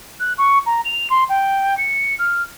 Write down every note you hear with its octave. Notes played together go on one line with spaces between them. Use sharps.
F#6
C#6
A#5
F7
C6
G5
C#7
F6